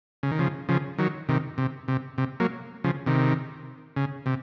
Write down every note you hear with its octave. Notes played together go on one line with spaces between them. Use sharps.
C#3
D#3
C#3 F3
C#3 F3
D#3 F#3
C3 D#3
C3
C3
C3
F#3 A#3
C#3 F3
C3 D#3
C#3
C3